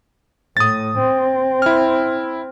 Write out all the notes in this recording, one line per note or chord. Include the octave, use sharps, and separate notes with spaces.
A2 D#6 A6
C4
E4 F6